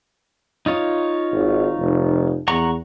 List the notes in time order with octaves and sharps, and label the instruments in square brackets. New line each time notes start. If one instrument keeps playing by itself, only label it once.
[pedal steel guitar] D#4 F4 C#5
[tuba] G#1
F1
[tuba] E2 [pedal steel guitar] F#5 A#5 C#6